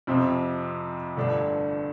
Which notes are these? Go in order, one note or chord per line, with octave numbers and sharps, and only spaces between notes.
F2 C3 F3 C4
G1 G2 D3 A3 D4